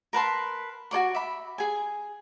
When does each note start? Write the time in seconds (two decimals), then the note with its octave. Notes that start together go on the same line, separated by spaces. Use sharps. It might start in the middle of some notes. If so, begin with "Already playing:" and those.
0.13 A#4 B4 A5 C6
0.91 F#4 A4 D5 C#6
1.15 E5 B5
1.58 G#4 G#5